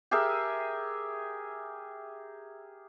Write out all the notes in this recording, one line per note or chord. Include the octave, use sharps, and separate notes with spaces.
G4 G#4 A#4 E5